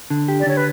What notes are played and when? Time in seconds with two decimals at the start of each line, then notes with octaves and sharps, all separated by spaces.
0.10 D3
0.28 G4
0.40 D5
0.47 D3 C#5
0.57 B4